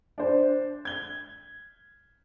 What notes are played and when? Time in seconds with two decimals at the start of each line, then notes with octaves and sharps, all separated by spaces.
0.18 D4 C5
0.85 G#6 G7